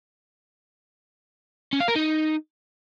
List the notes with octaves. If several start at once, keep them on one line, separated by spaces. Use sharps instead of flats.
C#4
F5
A#4
D#4